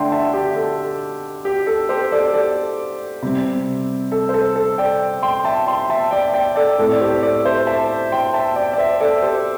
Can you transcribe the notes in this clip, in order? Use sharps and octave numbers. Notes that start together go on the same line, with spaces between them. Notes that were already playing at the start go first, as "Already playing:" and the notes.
Already playing: D3 A3 D4 E5 G5 A5 C6
E5 A5
G4
A4
G4
A4
G4 C5
A4 D5
A4 D5
C3 G3 C4
A4
C5
A4
A4
D5 G5
G5 C6
E5 A5
G5 C6
E5 A5
D5 G5
D5 G5
A4 D5
A2 A3 C4 A4
D5
G4 C5
A4 D5
C5 E5
E5 A5
G5 C6
E5 A5
D5 G5
D5
C5 E5
A4 D5
G4 C5